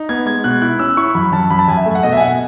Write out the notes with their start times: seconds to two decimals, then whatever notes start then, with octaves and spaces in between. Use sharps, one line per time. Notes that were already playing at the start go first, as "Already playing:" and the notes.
Already playing: D#4
0.09 B3 G#6
0.26 G#3 G#6
0.44 B2 F#6
0.62 E4 F#6
0.79 C#4 E6
0.97 E4 C#6
1.15 F#2 B5
1.32 F#2 A5
1.50 F#2 B5
1.59 A5
1.68 F#2 G#5
1.77 E5
1.86 A3
1.95 F#5
2.03 B2 D#5
2.13 E5
2.17 G#5
2.21 B2 F#5